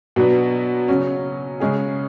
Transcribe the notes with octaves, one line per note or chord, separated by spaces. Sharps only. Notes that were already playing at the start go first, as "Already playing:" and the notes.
B2 F#3 B3 D4
C#3 F#3 C#4
C#3 G#3 C#4 G#4